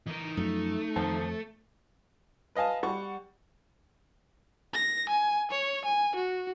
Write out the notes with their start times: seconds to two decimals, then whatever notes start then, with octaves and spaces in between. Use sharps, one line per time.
0.07 E3 D#4 A#4
0.37 F#2 F3 A3
0.96 F2 D#3 C5 A5
2.55 B4 D#5 F5 G#5 A5
2.83 G3 F#5 C#6
4.74 A#6
5.09 G#5
5.51 C#5
5.85 G#5
6.15 F#4